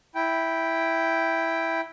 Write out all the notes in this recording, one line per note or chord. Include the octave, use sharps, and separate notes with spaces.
E4 G5